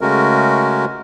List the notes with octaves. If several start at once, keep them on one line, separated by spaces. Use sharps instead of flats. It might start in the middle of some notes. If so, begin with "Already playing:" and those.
C#3 G#3 A3 C#4 F#4 A#4